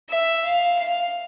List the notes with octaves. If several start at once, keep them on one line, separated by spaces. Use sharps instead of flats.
E5
F5
F5